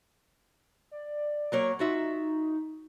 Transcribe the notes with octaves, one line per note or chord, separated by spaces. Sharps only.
D5
F#3 A#3 C#5
D#4 F4 F#4 E5